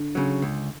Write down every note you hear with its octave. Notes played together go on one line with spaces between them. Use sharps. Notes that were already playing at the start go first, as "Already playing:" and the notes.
Already playing: D3
C#3 F#3
C#2